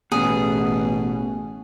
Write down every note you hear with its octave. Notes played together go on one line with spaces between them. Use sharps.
A1 B2 G#4